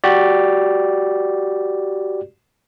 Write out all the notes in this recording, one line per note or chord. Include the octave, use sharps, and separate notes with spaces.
F#4 G4 D5